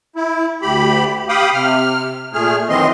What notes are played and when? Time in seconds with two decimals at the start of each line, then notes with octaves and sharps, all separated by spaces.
0.16 E4
0.62 D2 G4 B5
1.29 G4 F5 G5 B5 D#6
1.53 C3 F6
2.33 A#2 A3 G#4 F6
2.69 F#2 D#3 E3 C4 D#5 C6